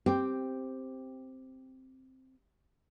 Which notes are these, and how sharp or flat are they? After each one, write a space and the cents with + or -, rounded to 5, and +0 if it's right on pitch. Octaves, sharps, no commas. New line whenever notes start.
C4 +0 G4 +0